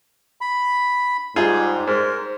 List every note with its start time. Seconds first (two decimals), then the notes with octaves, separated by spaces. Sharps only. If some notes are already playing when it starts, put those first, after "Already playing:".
0.41 B5
1.36 G#2 G3 D#4 F4 G#4
1.87 G#2 A#4 C5